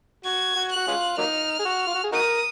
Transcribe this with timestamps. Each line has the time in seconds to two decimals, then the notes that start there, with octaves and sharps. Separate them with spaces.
0.24 F#4 G#6
0.56 F#4
0.71 F#4 F#6
0.87 G#3 C#4 F4
1.18 F#3 A#3 D#4 F6
1.59 G#4
1.65 F#4
1.87 F4
1.95 F#4
2.04 G#4
2.12 D#4 F#4 A#4 D#6